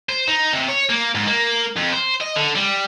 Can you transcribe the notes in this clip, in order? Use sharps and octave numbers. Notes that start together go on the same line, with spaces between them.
C5
D#4
C3
C#5
A#3
G#2
A#3
F2
C5
D#5
D3
G3